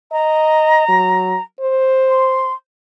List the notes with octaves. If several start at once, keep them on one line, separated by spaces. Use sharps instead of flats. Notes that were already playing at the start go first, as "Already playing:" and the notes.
D#5 A#5
F#3
C5
C6